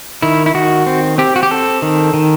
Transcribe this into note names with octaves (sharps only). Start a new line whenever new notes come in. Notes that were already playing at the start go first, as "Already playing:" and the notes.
D#3 E4
E4
D#3 F#4
C4
C4 G4
F#4
G4
C4 A4
D#3
D#3